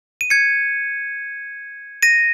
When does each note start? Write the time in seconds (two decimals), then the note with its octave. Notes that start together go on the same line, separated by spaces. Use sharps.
0.21 D#7
0.30 G#6 C#7
2.03 A#6 D#7